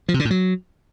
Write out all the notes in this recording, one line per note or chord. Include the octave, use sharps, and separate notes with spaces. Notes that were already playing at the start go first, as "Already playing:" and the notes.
F3
C3
D3
A2
F#3